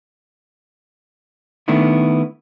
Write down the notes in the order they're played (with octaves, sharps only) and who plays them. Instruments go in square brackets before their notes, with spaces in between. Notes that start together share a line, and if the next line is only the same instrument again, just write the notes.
[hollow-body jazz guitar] D#3 A3 B3 D4 E4